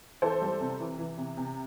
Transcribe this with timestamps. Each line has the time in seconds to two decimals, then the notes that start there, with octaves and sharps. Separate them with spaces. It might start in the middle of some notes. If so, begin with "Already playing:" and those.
0.22 E3 A4 C5
0.42 G3
0.61 C3
0.80 E3
0.98 E3
1.18 C3
1.37 C3